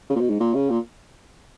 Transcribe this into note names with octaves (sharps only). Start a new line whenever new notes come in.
C#3
A#2
B2
G#2
A#2
C#3
A#2